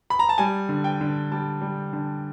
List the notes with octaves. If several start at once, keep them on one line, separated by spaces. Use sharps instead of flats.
B5
A#5
A5
G3 G#5
D3
G5
D3
G3 A5
G3
D3